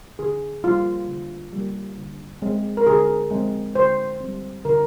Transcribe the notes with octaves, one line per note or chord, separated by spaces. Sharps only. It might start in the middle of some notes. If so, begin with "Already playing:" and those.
D3 G#4
G3 A#3 F4
D3
G3 A#3
D3
G#3 C4
A#4
D3 G#4
G#3 C4
D3 C5
G3 C4
D3 A#4